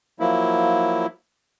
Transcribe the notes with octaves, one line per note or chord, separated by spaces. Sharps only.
F3 F#3 A#3 E4